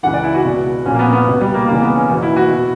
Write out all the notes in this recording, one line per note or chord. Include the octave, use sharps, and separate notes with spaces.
C#2 C#3 E3 F#5
D5
E4
F#4
C#2 B2
A#1 A#2 C#4
A#3
B3
B3
C#2 B2
G3
A#3
C#2 C#3 E3 A#3
B3
C#4
F#1 E2 B2
E4
F#4
B2